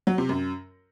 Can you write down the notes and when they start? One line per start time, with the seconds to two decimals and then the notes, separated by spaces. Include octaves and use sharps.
0.07 F#3
0.18 C3
0.29 F#2